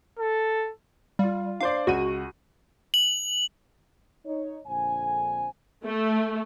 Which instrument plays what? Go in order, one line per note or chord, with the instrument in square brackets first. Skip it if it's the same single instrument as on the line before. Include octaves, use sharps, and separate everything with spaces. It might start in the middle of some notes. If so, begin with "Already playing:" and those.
[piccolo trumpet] A4
[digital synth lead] G3 [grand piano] F4 F5
[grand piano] D4 C5 D5 [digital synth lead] F5
[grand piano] C#2 F#5 D#7 [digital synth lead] F#4
[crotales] F#7
[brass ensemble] D#4 C#5
A#1 F2 D3 C5 G#5
[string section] A3